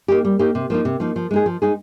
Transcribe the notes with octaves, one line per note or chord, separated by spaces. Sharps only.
A#3 D#4 G4
G3
A#3 D#4 G4
C3
F3 A#3 D#4
C3
F3 A#3 D#4
F3
G#3 D#4 G#4
F3
G#3 D#4 G#4